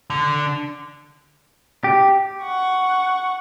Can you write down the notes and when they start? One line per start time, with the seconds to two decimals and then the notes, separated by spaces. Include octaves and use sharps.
0.10 D3
1.84 G4
2.43 F#5 C#6